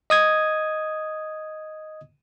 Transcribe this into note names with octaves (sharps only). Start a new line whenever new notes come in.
D#5 D#6 G#6